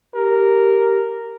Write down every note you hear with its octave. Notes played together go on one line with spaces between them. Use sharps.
G4 A#4